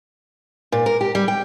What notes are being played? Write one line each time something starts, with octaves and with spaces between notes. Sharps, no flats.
A#2
A#4
G4
G3
G5